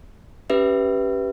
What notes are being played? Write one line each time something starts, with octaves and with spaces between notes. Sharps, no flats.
C#4 G4 B4 E5